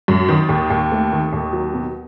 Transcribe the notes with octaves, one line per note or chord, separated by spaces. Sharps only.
F#2
D#3
D#2
D#2
A3
D#3
D#2
F#3
B2